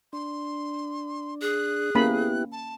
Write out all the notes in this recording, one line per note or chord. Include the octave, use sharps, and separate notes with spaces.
D4 C6
G#4 F#6
A#3 B3 C#4 E4 G4 B5
A5